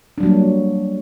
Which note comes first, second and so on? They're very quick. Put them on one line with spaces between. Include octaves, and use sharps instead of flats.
D4 G3 F#3 A#3